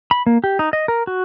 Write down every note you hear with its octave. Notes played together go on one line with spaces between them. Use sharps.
B5
A#3
G4
D#4
D#5
A#4
F#4